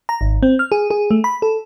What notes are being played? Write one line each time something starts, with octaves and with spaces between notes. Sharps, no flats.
A#5
G#1
C4
F6
G#4
G#4
A3
B5
A4